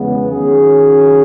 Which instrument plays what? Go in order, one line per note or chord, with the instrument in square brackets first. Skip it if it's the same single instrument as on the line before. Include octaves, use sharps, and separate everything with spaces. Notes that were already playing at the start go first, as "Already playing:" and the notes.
Already playing: [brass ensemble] E2 C#3 G#3 B3
D#3 F#3 C#4 G#4